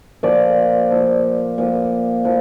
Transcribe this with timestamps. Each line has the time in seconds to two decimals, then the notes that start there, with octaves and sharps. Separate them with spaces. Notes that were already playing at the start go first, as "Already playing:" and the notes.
0.23 A#2 F3 D5
0.91 A#2 F3
1.58 A#2 F3
2.24 A#2 F3